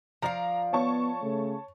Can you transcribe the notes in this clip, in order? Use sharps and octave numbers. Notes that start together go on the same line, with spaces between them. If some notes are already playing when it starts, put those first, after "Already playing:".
F3 D5 F5 A#5
B3 C#5 A5 C#6
C#3 A3